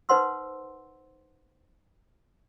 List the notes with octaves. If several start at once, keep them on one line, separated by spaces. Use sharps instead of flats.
D#4 B4 C5 F#5 C6 E6